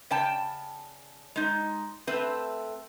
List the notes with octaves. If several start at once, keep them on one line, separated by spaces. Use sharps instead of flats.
C#3 D5 G5 A5
G#3 D#4
A3 C4 B4